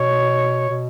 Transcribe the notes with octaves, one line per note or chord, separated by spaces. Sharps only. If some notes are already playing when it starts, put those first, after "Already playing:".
Already playing: B2 C#5
B2